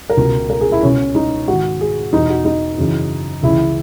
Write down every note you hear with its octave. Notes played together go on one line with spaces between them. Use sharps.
A#4
C#2 B2
A#4
G#4
E4
C#2 B2 C#4
D#4
G#2 D#3 F#4
G#4
E2 B2 D#4
F#4
D#4
F#2 C#3 E3
C#2 C#3 E3 E4